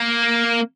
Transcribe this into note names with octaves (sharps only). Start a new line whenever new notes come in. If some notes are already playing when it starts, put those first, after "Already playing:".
Already playing: A#3